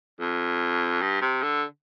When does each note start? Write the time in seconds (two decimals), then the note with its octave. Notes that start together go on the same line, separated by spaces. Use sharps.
0.20 F2
1.01 G2
1.21 C3
1.42 D3